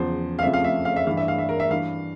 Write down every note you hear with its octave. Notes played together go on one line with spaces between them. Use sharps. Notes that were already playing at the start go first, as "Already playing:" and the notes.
Already playing: E2 C#3 F3 C5
F5
F2 C#3 F3 E5
F5
E5
F5
E5
G2 E3 F5
E5
F5
E5
A#4
E5
G2 E3 F5